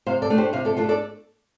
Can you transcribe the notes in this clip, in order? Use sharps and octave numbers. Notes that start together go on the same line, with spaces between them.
C3 C5 F5
A4 D5
A3 D4
G4 C5
C3 C5 F5
A4 D5
A3 D4 F4 A4
A4 D5